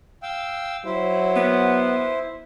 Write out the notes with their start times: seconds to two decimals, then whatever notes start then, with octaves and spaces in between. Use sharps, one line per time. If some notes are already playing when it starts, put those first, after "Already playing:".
0.23 F5 G5 E6
0.85 F#3 E4 C5
1.36 B3